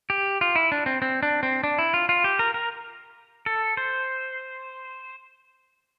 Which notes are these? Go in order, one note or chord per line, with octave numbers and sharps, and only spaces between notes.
G4
F4
E4
D4
C4
C4
D4
C4
D4
E4
F4
F4
G4
A#4
A#4
A4
C5